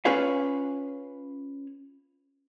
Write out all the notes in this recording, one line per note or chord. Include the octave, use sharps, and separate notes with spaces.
C#4 F4 G#4 B4 C#5 F5